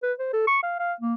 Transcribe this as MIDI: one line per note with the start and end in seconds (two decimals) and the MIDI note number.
0.03 0.13 71
0.20 0.29 72
0.33 0.45 69
0.47 0.58 85
0.63 0.76 77
0.79 0.93 77
1.01 1.14 58